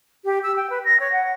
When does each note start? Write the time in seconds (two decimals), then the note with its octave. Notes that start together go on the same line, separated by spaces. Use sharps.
0.25 G4
0.43 E6
0.56 G5
0.70 B4
0.85 A#6
1.00 C#5
1.12 F#5